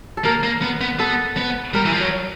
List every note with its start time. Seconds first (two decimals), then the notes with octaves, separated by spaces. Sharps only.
0.17 A4
0.25 A#3 A#4
0.43 A#3
0.62 B3
0.81 B3
0.99 B3 A4
1.37 B3
1.74 G3 A#4
1.85 E3
1.92 F3
1.99 F#3